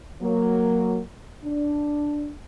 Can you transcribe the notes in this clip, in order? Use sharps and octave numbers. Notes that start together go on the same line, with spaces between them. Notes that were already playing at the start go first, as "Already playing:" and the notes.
F#3 A#3
D4